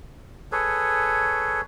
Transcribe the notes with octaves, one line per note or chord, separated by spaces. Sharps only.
G#4 A4 B4 C#5